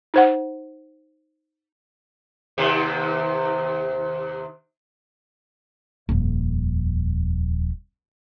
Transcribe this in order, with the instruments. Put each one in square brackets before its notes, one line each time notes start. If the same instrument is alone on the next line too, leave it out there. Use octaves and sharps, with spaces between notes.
[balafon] D#4 C5 F#5
[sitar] D#2 C3
[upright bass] D#1 F2